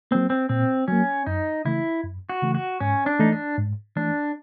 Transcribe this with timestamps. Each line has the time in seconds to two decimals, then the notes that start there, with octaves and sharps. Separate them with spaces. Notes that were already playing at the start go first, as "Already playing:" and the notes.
0.11 F#3 A#3 C4
0.30 C4
0.49 A#2 C4
0.88 F#3 A#3 C#4
1.26 F#2 D#4
1.65 C#3 E3 A3 E4
2.03 F#2
2.29 F#4
2.42 C#3 E3 A3
2.55 F#4
2.80 G#2 C#4
3.06 D4
3.19 E3 A3 D#4
3.32 D4
3.58 G#2
3.96 E3 A3 D4